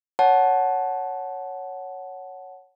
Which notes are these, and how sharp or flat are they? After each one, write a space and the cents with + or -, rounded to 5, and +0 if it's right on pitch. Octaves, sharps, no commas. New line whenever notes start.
C#5 +0 F#5 +0 A5 -15